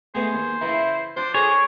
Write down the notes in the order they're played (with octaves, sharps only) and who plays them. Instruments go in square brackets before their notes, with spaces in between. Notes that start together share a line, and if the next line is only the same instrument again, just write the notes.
[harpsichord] G#3 A3 B3 [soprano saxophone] G#4 [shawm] C5
[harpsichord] D#2
[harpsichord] C#3 E3 [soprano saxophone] E4
[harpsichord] F3 [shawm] D4 [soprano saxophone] C5
[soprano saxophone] G#4 [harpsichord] A4 D#5 [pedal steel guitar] C#5